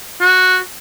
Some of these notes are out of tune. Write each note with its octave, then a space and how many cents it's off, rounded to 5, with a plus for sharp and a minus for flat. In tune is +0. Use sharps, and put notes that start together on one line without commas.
F#4 -5